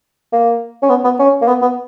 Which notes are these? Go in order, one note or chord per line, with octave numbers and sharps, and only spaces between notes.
A#3
C#4
B3
B3
C#4
A#3
B3
B3